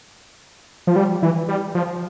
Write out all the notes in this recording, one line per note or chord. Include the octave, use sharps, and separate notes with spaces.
F3
G3
E3
G3
F3